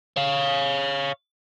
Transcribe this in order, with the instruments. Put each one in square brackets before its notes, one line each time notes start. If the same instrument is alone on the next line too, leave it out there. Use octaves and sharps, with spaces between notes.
[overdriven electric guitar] C#5 F5